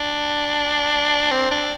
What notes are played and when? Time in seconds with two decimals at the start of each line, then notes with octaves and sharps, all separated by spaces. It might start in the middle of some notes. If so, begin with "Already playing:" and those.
Already playing: D4
1.31 C4
1.51 D4